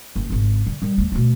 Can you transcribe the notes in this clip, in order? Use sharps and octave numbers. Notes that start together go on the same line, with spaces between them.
F#1
G#1 C#2
D3
D#3 G3
D2
D2 B2